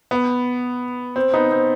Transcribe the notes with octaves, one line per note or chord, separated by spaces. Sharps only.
B3
C4
B3 D#4
C4